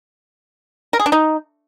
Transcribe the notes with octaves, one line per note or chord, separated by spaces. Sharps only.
A#4
G#4
D4
D#4